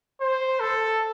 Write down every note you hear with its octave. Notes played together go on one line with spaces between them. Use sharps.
C5
A4